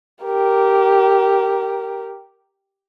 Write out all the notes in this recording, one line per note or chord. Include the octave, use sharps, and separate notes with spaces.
G4 A#4